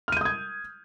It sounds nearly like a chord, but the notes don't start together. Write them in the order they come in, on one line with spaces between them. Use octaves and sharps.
F6 D#7 G6 D#6 G#6